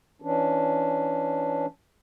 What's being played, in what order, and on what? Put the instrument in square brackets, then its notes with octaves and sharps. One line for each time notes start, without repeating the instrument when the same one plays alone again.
[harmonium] E3 C#4 D4